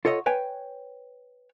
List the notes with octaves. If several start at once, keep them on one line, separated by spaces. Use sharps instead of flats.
F4 A4 C#5 D#5 E5 F#5
B4 C#5 G5 G#5